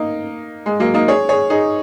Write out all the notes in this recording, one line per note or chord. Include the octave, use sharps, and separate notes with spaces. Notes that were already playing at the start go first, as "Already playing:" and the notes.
Already playing: A#3 D#4
G#3
F#3 A#3
A#3 D#4
G#4 C#5
G#4 C#5
D#4 G#4